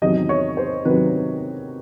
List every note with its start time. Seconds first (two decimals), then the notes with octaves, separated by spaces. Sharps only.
0.02 E2 C3 D#3 F#3 D#5
0.29 C#5
0.57 C5
0.85 C3 D#3 F#3 B4